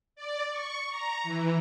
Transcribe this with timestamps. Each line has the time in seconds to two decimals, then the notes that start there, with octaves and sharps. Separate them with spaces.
0.16 D5
0.51 C#6
0.90 A#5
1.24 E3